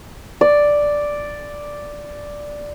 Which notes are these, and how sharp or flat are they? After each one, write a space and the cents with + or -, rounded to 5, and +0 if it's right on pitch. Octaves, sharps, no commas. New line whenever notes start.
D5 +0